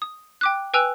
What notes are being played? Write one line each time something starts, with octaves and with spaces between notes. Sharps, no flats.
D#6
G5 D6 F#6
B4 G5 G#5 E6 F#6 F7